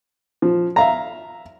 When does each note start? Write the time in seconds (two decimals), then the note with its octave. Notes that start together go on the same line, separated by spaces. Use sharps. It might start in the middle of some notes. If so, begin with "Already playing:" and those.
0.42 F3
0.76 E5 F5 A#5